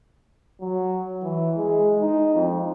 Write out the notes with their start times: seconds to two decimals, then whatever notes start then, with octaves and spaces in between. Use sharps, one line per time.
0.60 F#3
1.22 E3
1.57 G#3
2.01 D#4
2.34 F2